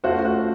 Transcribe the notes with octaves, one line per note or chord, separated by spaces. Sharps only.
A3 C#4 F4 F#4 A4 C5
F#4